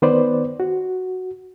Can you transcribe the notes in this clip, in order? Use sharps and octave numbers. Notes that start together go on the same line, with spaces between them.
D#3 B3 B4 C5 D5
F#4